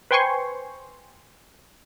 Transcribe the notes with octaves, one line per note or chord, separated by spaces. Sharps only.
B4 C5 G5 G#5 C6 C#6